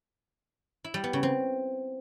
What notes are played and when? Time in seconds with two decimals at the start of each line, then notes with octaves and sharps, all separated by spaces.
0.84 E4
0.94 G3
1.04 B3
1.13 C#3
1.23 C4